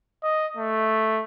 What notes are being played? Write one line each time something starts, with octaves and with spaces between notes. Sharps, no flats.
D#5
A3